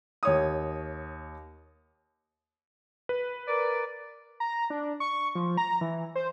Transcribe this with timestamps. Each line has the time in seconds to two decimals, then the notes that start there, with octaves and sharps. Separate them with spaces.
0.23 D#2 C#5 D#6
3.09 B4
3.47 A#4 D5
4.40 A#5
4.70 D4
5.00 C#6
5.35 F3
5.58 A#5
5.81 E3
6.15 C5